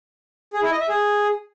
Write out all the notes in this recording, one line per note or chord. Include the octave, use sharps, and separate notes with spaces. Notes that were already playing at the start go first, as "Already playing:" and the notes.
G#4
E4
D#5
E5
G#4